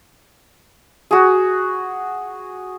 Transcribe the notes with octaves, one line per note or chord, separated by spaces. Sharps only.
F#4 G#4